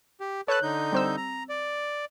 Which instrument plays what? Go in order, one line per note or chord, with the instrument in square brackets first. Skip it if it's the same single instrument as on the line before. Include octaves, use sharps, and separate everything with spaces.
[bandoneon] G4
[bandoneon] A4 B4 A5 [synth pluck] C#5 F#6
[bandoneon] D3 D#4 G6
[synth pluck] G3 C4 E6
[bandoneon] A#5
D5